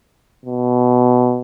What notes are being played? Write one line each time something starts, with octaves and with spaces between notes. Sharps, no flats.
B2